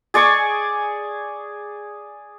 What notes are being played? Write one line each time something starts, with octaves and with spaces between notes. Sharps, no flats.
G#4 D5 G#5 C#6